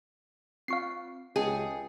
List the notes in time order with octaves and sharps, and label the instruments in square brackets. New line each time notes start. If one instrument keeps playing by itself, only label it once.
[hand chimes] C4 F4 [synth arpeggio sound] F5 C#6 C7
[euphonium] C#2 [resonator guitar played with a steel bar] G#4 [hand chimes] D#5 G5 A5